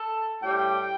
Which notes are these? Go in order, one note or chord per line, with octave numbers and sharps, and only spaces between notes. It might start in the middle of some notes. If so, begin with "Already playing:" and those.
Already playing: A4
A2 G3 G5